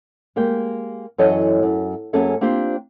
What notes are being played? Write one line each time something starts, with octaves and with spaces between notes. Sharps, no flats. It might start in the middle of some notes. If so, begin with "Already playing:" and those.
G#3 A#3 G4 G5
F#2 E3 F#3 A4 C#5 D#5
F#2
F#2 A#3 C#4 G#4 A4 E5
A#3 C4 D4 F4 G4 C5